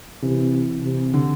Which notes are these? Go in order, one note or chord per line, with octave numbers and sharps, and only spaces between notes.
C3 E3
C3
D3